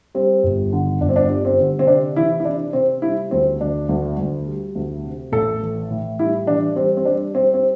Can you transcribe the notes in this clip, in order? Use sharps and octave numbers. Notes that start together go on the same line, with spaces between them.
G3 C4
G1
D3
G1 D4
C4
D4
G3
C4
D3
C4
C3 D4
E3 E4
E4
C3 D4
C3 C4
G3 E4
D2 C4
D2 D4
D2
D2
G3
D2
C3
A1 A4
E3
A2
G3 E4
E3 D4
G3 C4
C4
G3 D4
G3 C4
C4